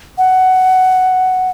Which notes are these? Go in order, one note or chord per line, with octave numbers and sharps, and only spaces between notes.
F#5